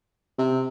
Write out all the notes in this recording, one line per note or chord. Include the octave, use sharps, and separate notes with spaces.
C3